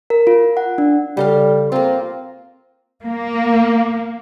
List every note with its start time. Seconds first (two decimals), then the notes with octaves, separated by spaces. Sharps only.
0.10 A#4
0.27 F4
0.57 F#5
0.78 D4
1.17 C#3 G3 A4 F5
1.72 A#3 C4 F4
3.05 A#3